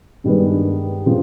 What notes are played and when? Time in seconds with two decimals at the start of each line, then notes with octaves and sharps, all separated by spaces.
0.24 G2 D#3 G#3 B3 D4
1.06 C#3 F3